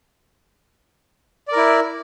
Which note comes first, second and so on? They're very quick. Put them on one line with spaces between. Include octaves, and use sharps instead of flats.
D5 A#4 E4